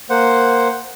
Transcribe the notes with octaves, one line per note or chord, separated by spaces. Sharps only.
A#3 C5 F#5